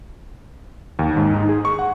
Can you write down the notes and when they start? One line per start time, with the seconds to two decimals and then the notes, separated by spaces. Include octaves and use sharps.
0.99 D#2
1.17 G#2
1.34 D#4
1.49 G#4
1.65 C#6
1.79 F#5